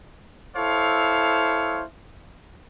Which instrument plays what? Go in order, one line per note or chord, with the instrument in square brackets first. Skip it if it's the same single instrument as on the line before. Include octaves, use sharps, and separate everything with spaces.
[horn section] E4 A4 C5 C#5 F5